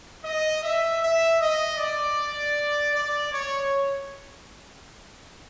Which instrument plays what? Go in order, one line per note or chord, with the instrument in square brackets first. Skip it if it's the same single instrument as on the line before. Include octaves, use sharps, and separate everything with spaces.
[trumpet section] D#5
E5
E5
D#5
D5
D5
C#5